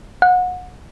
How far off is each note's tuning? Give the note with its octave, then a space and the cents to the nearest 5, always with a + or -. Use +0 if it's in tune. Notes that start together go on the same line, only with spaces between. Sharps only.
F#5 -30